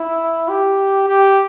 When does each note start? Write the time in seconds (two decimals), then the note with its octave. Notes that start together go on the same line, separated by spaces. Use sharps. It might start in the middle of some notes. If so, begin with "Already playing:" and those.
Already playing: E4
0.48 G4
1.08 G4